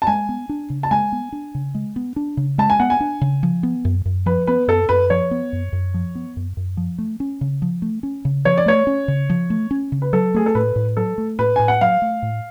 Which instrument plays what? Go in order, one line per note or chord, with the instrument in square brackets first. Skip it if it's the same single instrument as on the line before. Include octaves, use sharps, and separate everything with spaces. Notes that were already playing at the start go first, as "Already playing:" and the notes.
[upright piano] A5
[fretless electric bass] G#3 [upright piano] G#5
[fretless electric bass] B3
D4
C#3
[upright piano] A5
[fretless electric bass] G#3 [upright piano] G#5
[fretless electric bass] B3
D4
C#3
G#3
B3
D4
C#3
[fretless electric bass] G#3 [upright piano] A5
[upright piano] G#5
[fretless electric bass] B3 [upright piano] F#5
[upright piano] G#5
[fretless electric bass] D4
C#3
F3
B3
F#2
F#2
[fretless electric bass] F3 [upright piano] B4
[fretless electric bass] B3 [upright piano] B4
[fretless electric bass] F#2 [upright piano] A4
[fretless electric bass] F#2 [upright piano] B4
[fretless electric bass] F3 [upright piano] C#5
[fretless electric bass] B3
F#2
F#2
F3
B3
F#2
F#2
F3
A3
C#4
C#3
F3
A3
C#4
C#3
[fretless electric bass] F3 [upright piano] C#5
[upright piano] D5
[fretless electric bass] A3 [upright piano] C#5
[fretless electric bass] C#4
C#3
F3
A3
C#4
C#3
[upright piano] B4
[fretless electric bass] F#3 [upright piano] A4
[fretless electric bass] A3 [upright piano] G#4
[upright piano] A4
[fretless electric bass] A2 [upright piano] B4
[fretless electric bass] A2
[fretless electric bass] F#3 [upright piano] A4
[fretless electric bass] A3
[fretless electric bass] A2 [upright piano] B4
[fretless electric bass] A2 [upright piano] G#5
[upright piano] F#5
[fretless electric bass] F#3 [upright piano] F5
[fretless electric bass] A3
A2